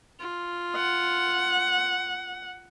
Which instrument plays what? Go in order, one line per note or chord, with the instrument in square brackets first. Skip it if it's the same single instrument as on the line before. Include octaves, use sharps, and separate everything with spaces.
[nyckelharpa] F4
[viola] F#5